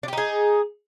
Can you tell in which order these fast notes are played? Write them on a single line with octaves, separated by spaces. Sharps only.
D4 G4 D#4 G#4